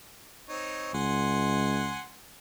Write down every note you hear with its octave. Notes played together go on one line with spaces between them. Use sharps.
C4 D#4 C#5
C#2 F#5 G#5 C6